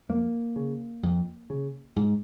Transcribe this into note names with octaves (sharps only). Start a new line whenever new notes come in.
F2 A#3
C#3
F2
C#3
G#2